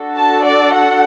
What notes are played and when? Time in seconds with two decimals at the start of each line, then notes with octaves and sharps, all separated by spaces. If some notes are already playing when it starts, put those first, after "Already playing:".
Already playing: D4 F#4 A4
0.16 A5
0.44 D5
0.73 F#5